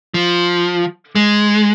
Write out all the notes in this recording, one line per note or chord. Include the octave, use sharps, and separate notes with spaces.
F3
G#3